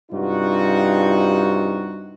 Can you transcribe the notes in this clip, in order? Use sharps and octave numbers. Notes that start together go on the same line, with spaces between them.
G2 C3 D#4 F4 F#4